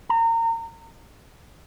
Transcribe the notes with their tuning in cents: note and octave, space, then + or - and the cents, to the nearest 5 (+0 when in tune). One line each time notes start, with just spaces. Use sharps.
A#5 -30